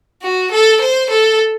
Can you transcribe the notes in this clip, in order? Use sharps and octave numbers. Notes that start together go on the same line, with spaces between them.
F#4
A4
C5
A4